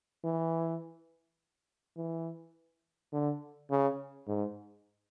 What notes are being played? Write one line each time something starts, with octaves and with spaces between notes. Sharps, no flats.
E3
E3
D3
C#3
G#2